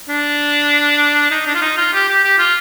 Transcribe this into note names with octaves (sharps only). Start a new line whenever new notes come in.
D4
D#4
D4
F4
D#4
F4
G4
G4
G4
F4